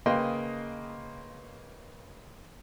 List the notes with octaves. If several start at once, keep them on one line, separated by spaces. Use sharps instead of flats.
C#3 A#3 B4 D#5 G5 C6